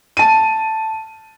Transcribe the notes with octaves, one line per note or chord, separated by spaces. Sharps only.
A5 D#7